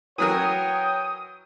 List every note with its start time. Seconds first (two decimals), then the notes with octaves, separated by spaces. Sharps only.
0.18 E3 F#3 A#4 C#5 F#5 G5 D#6